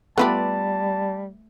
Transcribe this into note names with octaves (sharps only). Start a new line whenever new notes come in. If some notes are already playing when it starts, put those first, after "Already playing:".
G3 A3 B3 F4 G4 B4 D5 A5